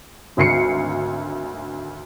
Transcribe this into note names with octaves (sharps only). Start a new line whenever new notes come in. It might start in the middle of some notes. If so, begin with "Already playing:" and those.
G#1 D2 C7 C#7